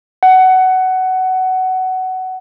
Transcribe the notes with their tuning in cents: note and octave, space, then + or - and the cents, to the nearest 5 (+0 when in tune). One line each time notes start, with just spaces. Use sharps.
F#5 +15